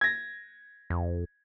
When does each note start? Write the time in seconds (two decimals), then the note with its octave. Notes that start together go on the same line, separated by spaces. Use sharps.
0.01 G#6 A#6
0.90 F2